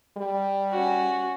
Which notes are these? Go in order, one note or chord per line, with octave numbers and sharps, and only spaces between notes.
G3
C#4 F#4